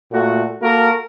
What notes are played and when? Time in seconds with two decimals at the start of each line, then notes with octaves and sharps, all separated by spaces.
0.12 A#2 A3 F#4
0.62 A#3 F#4 A4 A#4